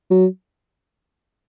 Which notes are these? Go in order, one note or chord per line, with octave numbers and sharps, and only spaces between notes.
F#3